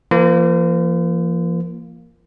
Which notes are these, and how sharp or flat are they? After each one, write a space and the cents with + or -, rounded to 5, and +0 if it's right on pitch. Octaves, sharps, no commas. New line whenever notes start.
F3 -40 A#3 +0 C5 -40